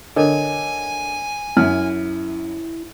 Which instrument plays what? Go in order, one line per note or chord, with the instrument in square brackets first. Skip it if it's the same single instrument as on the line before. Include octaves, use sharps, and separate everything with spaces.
[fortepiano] D3 [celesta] A#4 C#5 D#5 [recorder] G#5
[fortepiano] F#2 [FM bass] E4 [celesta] F6